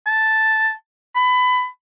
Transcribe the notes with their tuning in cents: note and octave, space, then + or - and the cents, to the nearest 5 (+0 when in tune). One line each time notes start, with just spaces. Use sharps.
A5 +0
B5 +25